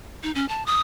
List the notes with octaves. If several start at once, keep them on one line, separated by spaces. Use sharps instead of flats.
D#4
C#4
A5
D#6